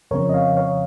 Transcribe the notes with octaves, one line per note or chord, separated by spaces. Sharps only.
F2 C#3 F3 C4 A#4 C#5
D#5
C#5 F5
C#5 F5